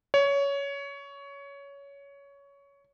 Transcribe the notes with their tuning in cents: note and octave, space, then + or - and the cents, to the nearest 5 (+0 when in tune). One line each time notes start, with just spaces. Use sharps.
C#5 +15